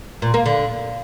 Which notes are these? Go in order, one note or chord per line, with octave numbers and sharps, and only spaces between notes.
A#2
A#3
D3